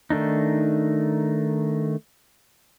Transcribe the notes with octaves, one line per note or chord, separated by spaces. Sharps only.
D#3 A3 D4 D#4